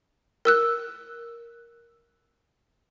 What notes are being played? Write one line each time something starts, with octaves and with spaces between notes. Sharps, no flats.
A#4 E6 F#6